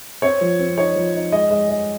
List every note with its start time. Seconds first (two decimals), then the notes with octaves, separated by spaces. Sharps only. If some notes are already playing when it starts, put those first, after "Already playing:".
0.22 C4 C#5
0.41 F3
0.59 C4
0.77 D#4 C#5
0.96 F3
1.15 D#4
1.32 G#3 D#5
1.51 G#3
1.69 G#3